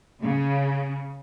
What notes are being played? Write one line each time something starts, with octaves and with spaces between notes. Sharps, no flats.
C#3